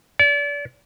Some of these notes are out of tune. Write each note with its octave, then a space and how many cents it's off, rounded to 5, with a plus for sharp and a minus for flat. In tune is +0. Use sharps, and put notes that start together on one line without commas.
D5 -35